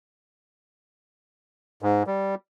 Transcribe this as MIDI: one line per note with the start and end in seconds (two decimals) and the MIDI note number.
1.82 2.03 44
2.07 2.35 55